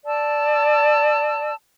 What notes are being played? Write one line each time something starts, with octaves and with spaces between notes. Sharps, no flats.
D5 A5 E6